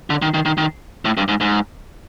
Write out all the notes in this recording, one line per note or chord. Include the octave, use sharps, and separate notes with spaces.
D3
D#3
D#3
D#3
D#3
A2
G2
G#2
G#2